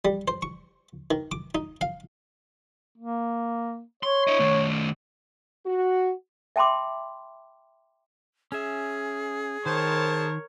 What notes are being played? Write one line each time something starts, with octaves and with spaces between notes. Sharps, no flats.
G3
C5
C#6
D#3
D6
D#4
F5
A#3
C#5 C6
E4 D#5
D#3 A3
F#4
E5 G5 A5 B5 C6 D6
C#4 G#4 E5
D#3 A#4 C5 C#5 A5